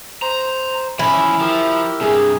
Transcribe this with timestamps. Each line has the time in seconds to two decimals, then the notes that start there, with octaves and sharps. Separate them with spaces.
0.22 C5 A#5
0.99 E3 F3 C#4 E4
1.40 F3 G4 A#4 E6
2.01 G2 C3 G#4